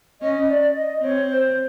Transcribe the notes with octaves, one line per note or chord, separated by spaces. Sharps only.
C#4 D#5
D5
D#5
C4 C#5
C5